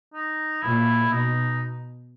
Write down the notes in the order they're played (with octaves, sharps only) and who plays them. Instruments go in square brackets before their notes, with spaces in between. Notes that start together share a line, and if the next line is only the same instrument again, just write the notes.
[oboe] D#4
[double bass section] A#2 [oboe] E4
[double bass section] B2 [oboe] D#4